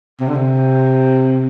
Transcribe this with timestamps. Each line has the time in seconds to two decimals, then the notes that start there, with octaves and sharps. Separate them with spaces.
0.20 C3
0.28 D3
0.35 C3